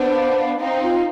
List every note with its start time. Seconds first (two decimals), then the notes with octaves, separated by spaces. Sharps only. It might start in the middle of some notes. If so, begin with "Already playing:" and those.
Already playing: B3 D4 C5
0.15 F5
0.37 F5
0.60 C4 D#4 F5
0.82 F4